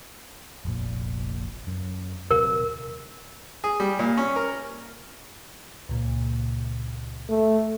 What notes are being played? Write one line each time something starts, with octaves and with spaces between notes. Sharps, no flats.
F1 A#1 A#2
F#2
D#1 C3 F#3 A#4
G#4
G3
A#2
C#4
A#4
C#2 A#2
A3